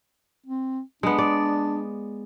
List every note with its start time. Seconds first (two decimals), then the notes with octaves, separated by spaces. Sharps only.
0.46 C4
1.03 G#3 B3 D4
1.18 D5